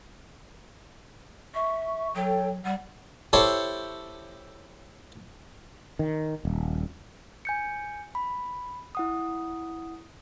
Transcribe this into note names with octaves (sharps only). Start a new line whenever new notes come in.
E5 C#6
F#3 A4 C#5 G5
G3 F#5
E4 G4 A4 C5 C#5
D#3
D#1
G#5 G6 C#7
B5
E4 F#5 D#6